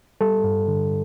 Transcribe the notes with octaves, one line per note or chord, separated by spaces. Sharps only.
G3 A4
G2
D3